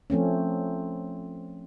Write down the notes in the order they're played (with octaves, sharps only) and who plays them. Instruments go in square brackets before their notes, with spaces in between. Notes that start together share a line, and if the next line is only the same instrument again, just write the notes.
[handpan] F3 A3 C4 C#4